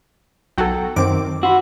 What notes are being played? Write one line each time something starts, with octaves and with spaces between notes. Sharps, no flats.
B1 F#3 A4 F#5 G5
F#2 D#3 C4 D6
F#4 B5 C6 E6